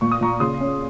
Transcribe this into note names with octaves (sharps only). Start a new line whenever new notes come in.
A#2 C#6
D#6
A#2 A#5 C#6
C#3 C6 D#6
C#4